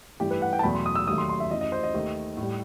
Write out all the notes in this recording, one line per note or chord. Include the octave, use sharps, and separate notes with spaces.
G2 E3 A3 G4
B4
F#5
G5
A5
E2 B2 F#3 A3 B5
C6
D#6
E6
D#2 D#3 F#3 A3 D#6
C6
C6
E5
F#2 E3 A3 D#5
D#5
C5
D#5
D#2 D#3 A3
A2
G3